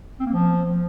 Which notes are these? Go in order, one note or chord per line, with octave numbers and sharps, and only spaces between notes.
C4
A#3
F3